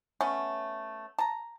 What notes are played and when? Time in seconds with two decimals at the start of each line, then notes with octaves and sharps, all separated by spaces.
0.21 A3 B3 C#4
1.19 A5 A#5